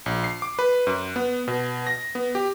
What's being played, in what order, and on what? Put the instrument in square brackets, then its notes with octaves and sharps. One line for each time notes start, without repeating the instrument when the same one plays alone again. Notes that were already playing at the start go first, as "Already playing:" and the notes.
[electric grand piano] A#1
C7
D6
B4
F#2
B3
B2
A#6
B3
G4